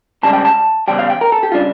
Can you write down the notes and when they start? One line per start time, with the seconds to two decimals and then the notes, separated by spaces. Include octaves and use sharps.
0.23 C#2 C#3 G3 A5
0.33 G5
0.45 A5
0.88 E2 C#3 G3 G5
0.99 F5
1.10 G5
1.21 A#4
1.32 A4
1.43 G4
1.52 C#3 G3 D4 F4